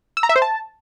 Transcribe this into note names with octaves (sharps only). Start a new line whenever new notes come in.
E6
A#5
E5
C5
A5